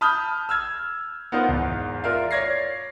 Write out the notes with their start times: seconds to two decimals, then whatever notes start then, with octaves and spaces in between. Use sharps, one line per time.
0.01 A5 B5 D#6 F6 G6
0.49 E6 F6 G#6
1.32 B3 D#4 F4 A#4 C5
1.49 E2 G#2
2.04 F4 A#4 D5 E5 F5
2.31 C#5 D5 G#6 A#6 C7